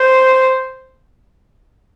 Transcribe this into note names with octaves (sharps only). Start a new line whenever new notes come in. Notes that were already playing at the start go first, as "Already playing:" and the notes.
Already playing: C5